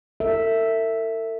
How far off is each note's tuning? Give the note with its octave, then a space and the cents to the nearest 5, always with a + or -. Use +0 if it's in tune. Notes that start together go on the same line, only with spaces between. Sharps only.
A4 +45 E5 +0